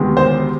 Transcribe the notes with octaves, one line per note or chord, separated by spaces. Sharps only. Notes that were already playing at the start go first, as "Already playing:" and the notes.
Already playing: D2 C3 D#3 G#3 B3
C5